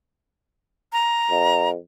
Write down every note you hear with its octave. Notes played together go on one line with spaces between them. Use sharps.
A#5
F2